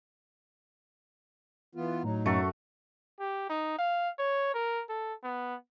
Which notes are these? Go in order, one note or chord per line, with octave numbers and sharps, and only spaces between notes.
E3 B3 F4
A2 F#3 D#4
F#2 A3 F#4 A4
G4
D#4
F5
C#5
A#4
A4
B3